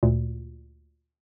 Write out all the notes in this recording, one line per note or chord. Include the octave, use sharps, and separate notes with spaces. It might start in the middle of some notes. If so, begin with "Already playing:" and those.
D2 A#2